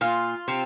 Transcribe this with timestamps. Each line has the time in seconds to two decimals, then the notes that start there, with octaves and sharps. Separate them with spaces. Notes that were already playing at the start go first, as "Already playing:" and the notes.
0.01 A#2 F4
0.48 C3 C4